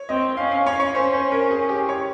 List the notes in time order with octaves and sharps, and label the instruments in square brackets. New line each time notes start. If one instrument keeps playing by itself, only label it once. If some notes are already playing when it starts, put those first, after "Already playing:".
Already playing: [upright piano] C#5
[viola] C4 [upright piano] D#5
[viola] C#4 [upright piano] F5
[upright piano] F5
[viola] C#4 [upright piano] C#5
[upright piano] C#5
C5
C5
A#4
G#4
G4
C#5